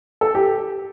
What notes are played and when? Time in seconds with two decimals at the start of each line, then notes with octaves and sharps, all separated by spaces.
0.21 A4
0.35 G4